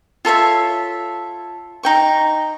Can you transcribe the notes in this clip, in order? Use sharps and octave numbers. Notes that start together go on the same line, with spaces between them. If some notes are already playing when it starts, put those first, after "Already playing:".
F4 A4 C#5 E5
D#4 G5 C#6